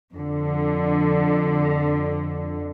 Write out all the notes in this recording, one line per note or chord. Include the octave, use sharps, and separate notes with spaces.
F2 D3